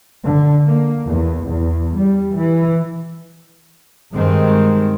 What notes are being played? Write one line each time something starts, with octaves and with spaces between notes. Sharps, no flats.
D3
A#3
E2
E2
G3
E3
G2 D#3 G#3 C4